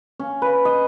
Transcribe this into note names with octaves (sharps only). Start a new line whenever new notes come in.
C#4
B4
D#5